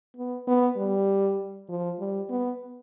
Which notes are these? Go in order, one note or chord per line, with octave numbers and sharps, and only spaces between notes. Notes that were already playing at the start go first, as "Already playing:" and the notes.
B3
B3
G3
F3
G3
B3